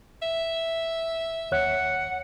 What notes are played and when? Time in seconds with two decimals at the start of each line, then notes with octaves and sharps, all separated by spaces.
0.22 E5
1.52 D#2 C#5 F#5 F#6